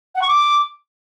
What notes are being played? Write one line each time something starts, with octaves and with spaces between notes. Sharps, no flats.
F#5
C#6
D6